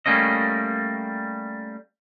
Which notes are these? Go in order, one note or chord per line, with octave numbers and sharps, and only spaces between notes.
G3 A3 A#3 C#4 D#5